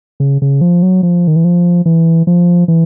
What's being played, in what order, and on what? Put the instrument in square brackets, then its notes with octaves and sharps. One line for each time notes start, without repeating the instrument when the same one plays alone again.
[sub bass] C#3
C#3
F3
F#3
F3
D#3
E3
F3
E3
F3
E3